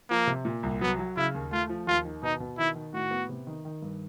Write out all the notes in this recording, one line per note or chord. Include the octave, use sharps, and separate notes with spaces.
F3 A#3
C3
A#2
C2
F#3 B3
F#3
C#3 E4
D#2
A3 F4
F3
D#2 F4
D#3
B2 D#4
B2
D#3 E4
D#3
A2 F#4
B3
C3
D#3
D#3
G2